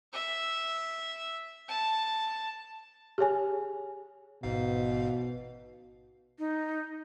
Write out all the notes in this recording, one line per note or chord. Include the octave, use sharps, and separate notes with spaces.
E5
A5
G4 G#4 C#5 G#5
A1 G#2 B2 F5
D#4